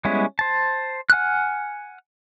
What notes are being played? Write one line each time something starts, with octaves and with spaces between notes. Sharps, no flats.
G3 G#3 B3 C#4 E4
C5 A5
F#5 G#5 F6 F#6